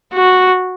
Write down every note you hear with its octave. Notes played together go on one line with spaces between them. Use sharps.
F#4